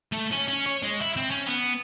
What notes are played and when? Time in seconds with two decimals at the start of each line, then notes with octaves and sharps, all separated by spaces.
0.12 A3
0.31 C#4
0.48 C#4
0.66 C#5
0.83 G#3
1.00 E4
1.16 C4
1.31 C#4
1.46 B3